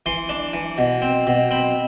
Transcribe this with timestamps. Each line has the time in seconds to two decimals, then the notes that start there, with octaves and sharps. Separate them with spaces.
0.06 E3 C6
0.29 D4
0.53 E3
0.78 B2
1.02 C4
1.27 B2
1.51 C4 B5